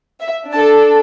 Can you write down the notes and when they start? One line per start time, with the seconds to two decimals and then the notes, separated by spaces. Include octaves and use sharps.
0.20 E5
0.52 D4 A4 A5